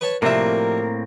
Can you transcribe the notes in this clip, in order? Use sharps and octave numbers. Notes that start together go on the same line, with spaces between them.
B4 C#5 A5
A2 C3 F3 G3 A#3 C4 A#4 E5